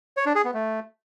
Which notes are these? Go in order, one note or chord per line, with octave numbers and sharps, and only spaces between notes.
C#5
D4
G#4
B3
A3